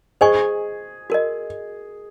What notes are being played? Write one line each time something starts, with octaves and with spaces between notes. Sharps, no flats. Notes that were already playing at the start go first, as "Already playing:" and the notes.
G#4 C5 D#5 G#5 C#6
F#4 A#4 D#5